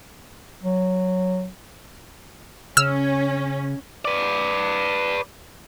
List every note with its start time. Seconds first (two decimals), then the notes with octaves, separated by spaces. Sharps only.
0.63 F#3
2.77 C#3 C#4 E6 F6
4.05 B4 D5